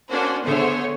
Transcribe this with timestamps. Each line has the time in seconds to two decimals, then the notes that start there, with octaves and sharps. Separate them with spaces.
0.11 A#3 C#4 D4 F#4 C5
0.44 D3 A3 B3 G#4 C5 C#5